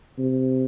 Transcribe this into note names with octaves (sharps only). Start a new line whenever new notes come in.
C3